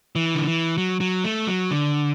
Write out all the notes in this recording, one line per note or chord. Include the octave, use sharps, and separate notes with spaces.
E3
D3
E3
F#3
F#3
A3
F#3
D3